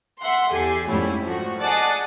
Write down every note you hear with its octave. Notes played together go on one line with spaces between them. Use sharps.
E5 F#5 C6
E2 G4 A4 G#5 C7
F2 G#2 G3 A3 C#4 E4
F3 A3 F#4
G#4 D5 D#5 F#5 A5